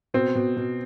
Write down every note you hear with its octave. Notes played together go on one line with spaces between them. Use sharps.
B2 C4
B2
B2